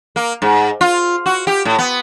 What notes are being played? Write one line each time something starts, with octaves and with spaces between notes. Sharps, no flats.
A#3
G#2
F4
F#4
G4
A2
B3